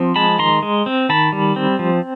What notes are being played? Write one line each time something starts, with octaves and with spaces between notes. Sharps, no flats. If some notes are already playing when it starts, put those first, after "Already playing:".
Already playing: F3 C4
G#3 A5 B5
D#3 A#5 C6
G#3
C4
D#3 A5 B5
G3
C4
F3